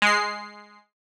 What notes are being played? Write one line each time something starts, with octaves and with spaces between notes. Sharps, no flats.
G#3 C7